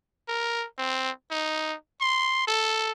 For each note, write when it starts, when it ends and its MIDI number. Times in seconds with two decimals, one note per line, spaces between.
0.28 0.66 70
0.78 1.11 60
1.31 1.75 63
2.01 2.47 84
2.47 2.92 69